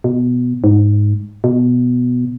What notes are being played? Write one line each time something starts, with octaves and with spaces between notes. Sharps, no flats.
B2
G#2
B2